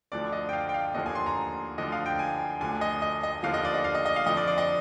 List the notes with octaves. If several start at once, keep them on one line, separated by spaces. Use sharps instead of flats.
D2 D3 F3 D5
D#5
G5
F5
G5
F5
D#2 D3 F3 D#5
G#5
C6
A#5
D2 D3 F3 D#5
F5
G5
G#5
D2 D3 F3 G#5
D#5
D#5
D#5
D#2 D3 F3 F5
D#5
D5
D#5
F5
D#5
D#5
F5
F2 D3 F3 D#5
D5
D5
D#5